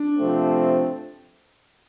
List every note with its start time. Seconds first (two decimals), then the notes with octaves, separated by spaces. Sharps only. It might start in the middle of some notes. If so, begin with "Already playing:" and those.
Already playing: D4
0.17 C3 F3 A3 C4